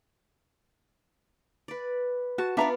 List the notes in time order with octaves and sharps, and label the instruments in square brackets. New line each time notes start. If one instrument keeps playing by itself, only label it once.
[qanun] B4 D5
[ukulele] F#4 [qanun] A5
[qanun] B3 F4 D5 [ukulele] D4 E5 A#5